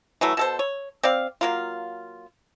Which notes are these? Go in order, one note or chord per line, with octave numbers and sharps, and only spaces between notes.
E3 F#3 A3
B2 A4 C5
C#5
C4 D5 F5
F#3 A#3 F4